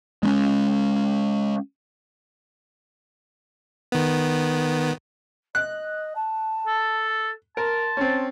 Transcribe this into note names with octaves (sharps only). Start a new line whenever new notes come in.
G#3 A#3 C#4
D#3 B3
D#5 F#6
A5
A4
A#4 A5 C6
C4 C#4